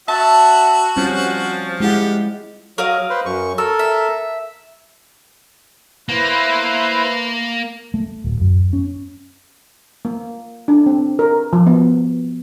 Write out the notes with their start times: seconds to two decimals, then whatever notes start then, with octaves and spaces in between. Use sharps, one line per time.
0.08 F#4 E5 F#5 A5
0.97 F3 G3 C4 C#4
1.80 G#3 E4 G4 F#5
2.78 F#3 A#4 D#5 F5
3.10 B4 C5
3.26 F#2 C#6
3.58 A4 A#4 E6
3.79 E5
6.09 A#3 E4 B4 C5
7.94 A3
8.24 D1
8.41 F#2
8.73 C#4
10.05 A#3
10.68 D4
10.86 C4
11.19 A#4
11.53 F3
11.67 B3